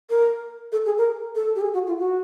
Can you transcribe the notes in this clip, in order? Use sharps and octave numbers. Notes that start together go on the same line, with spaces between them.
A#4
A4
G#4
A#4
A4
G4
G#4
F#4
F4
F#4